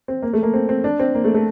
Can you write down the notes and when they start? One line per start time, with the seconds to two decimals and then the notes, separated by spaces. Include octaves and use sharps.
0.08 C4
0.22 A#3
0.33 A3
0.43 A#3
0.54 C4
0.69 C4
0.84 D4
1.00 C4
1.15 A#3
1.24 A3
1.34 A3